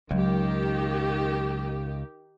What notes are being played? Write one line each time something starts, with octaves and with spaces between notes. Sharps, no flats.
C#2 D#3 F#3 G4